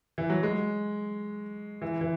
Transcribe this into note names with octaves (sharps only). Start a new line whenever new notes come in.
E3
F#3
G#3
E3
E3